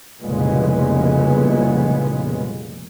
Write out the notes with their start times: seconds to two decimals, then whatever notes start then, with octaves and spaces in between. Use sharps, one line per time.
0.22 F1 C2 A#2 C#3 G#3 B3